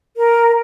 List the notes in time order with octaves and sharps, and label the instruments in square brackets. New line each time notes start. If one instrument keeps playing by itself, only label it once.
[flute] A#4